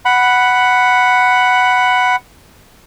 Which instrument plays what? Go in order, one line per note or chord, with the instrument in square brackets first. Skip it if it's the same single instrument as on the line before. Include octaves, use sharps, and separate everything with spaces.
[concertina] F#5 B5